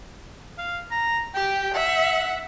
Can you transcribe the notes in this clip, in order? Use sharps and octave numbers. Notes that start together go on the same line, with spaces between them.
F5
A#5
G4 G5
E5 F#5